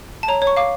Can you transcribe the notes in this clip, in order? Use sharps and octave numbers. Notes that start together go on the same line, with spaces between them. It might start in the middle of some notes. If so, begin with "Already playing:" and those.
A5
C#5 A#5
C#5
C#6
F5 D6